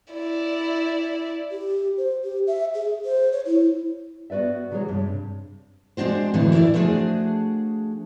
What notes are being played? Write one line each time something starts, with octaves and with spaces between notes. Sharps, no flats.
E4 D5
G4
C5
G4
E5
G#4
C5
C#5
E4
B3 F#4 B4 D5 E5
C#3 E3 F#3 G#3 G#4 C#5
G2 C3
G#3 C4 D4 F#4 C5
A2 D3 E3 F#3 A3
E4 A#4 C#5 D5 E5
F3 A3 D4 F#4 G#4